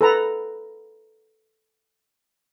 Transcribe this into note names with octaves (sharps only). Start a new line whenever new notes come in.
A4 B4 A#5